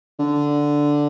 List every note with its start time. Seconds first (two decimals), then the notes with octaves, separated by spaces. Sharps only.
0.19 D3